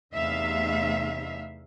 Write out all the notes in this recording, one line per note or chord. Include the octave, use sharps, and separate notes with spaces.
E2 C3 A3 D#4 E5 F5